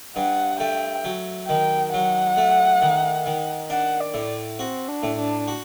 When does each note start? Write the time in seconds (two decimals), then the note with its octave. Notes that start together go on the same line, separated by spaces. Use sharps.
0.16 G2 F#5
0.60 A3 G5
1.04 F#3
1.48 D#3 G5
1.93 F#3 F#5
2.37 A3
2.82 D#3
3.26 D#3
3.70 D4 F#5
4.00 D5
4.14 A2
4.59 C4 F#4
4.88 D4
5.03 A2
5.18 D4
5.48 F#4